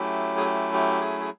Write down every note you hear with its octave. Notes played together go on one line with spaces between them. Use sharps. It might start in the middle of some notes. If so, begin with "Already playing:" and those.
Already playing: F#3 A3 C#4 E4 G4
G#4
G4
G4
G#4
G#4